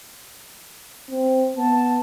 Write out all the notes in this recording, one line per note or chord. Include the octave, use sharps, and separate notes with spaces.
C4
B3 A5